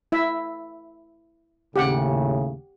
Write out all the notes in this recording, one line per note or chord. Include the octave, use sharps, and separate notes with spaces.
E4 E5
D#2 A2 C#3 G4 F#5